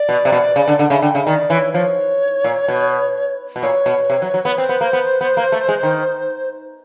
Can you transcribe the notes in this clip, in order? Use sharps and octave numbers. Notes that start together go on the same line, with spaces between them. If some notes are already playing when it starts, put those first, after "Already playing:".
Already playing: D5
B2
C3
B2
C#3
D3
D3 F#5
C#3 E5
D3 G5
C#3 E5
D#3 D5
E3 C#5
F3 C#5
A#2
B2
B2
A#2 C#5
B2
C3
F#3
F#3
B3
C4 C5
B3
A#3
B3
B3
A#3
A3
G#3
D#3